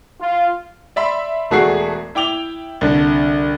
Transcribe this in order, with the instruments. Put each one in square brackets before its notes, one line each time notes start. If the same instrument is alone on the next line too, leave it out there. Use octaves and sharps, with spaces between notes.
[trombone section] F4
[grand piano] D5 E5 B5 C6 E6
E1 A3 F#4 G#4 D5 C7
E4 G5 D6 F7 G7
C2 D3